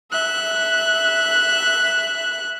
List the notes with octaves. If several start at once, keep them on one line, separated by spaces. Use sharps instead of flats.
E5 F#6